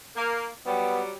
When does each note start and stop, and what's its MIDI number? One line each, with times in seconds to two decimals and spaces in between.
0.16 0.47 58
0.66 1.17 54
0.66 1.17 55
0.66 1.00 59